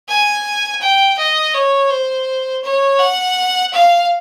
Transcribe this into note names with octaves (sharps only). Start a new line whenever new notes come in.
G#5
G5
D#5
C#5
C5
C#5
F#5
F5